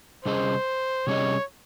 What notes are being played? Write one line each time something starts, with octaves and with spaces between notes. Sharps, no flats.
C3 G3 C#4 G#4 C5 D#5
C3 G3 C#4 G#4 C#5 D#5